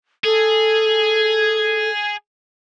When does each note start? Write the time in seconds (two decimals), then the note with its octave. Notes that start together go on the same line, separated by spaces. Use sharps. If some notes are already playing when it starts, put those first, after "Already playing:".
0.24 G#4 A4